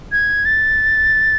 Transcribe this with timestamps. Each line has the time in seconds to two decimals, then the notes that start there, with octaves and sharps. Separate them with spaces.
0.12 G#6
0.45 A6